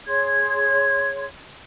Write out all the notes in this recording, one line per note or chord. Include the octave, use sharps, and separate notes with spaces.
G#4 C#5 C6 G#6